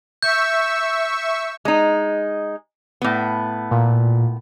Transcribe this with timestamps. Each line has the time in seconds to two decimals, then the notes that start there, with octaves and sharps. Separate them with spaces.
0.23 E5 C#6 E6 G6
1.65 G#3 D#4
3.02 A2 B3
3.71 A#2